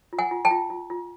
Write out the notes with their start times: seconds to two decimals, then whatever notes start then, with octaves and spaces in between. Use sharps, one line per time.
0.13 F4
0.19 F#5 G#5
0.31 F4
0.45 G5 A5
0.51 F4
0.70 F4
0.90 F4